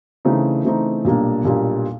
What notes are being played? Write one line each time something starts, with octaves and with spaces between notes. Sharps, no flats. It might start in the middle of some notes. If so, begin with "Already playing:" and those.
C#3 E3 A3 C4 D#4
C#3 E3 A3 C4 D#4
B1 A#2 G3 A#3 D4
B1 A#2 G3 A#3 D4